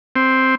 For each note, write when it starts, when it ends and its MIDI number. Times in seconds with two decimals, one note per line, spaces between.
0.16 0.55 60